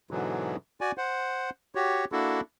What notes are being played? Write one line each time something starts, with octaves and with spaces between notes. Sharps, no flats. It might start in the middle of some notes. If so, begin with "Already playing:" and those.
G#2 B2 D3 E3 F#3
F#4 D5 G#5
C5 F#5
F#4 G4 C#5
A#3 D4 E4 F#4 A4